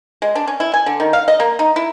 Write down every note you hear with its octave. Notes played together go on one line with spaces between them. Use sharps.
G#3
D4
C#4
E4
G#5
D3
D#3
F5
D#5
A#3
D#4
E4